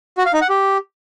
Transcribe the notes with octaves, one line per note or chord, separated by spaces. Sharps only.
F#4
F5
D#4
F#5
G4